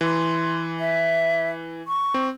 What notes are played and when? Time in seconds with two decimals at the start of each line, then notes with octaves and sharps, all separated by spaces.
0.01 E3 C6
0.80 E5
1.88 C#6
2.14 C4